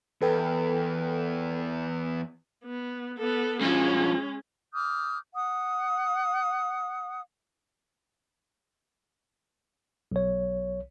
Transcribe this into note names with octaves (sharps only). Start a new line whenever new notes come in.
E2 A4 B4 G5
B3
B3 A4
G2 F3 G#3 C#4
D6 D#6 F6 G6
F#5 D#6
B1 C#5